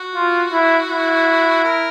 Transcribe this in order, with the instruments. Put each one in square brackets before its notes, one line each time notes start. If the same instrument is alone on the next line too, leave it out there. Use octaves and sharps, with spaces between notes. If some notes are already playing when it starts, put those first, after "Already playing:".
Already playing: [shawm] F#4
[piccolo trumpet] F4
E4
E4
[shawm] A#4